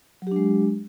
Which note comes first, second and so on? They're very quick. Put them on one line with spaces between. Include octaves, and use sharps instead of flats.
F#3 G4 D4 G#3